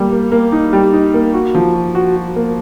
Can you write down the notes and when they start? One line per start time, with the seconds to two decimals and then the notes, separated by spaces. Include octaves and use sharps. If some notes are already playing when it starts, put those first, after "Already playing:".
Already playing: G3 A#3
0.12 A#3
0.32 A#3
0.52 D#4
0.73 G3
0.93 D#4
1.14 A#3
1.34 F#4
1.55 F3
1.74 F#4
1.95 F#4
2.16 F#4
2.36 A#3